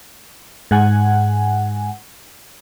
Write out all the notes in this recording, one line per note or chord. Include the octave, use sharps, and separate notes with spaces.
G#2 F#5 G#5